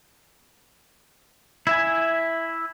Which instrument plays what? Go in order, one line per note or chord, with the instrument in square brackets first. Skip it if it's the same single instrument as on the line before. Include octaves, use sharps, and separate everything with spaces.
[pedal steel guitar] E4 E5 G#5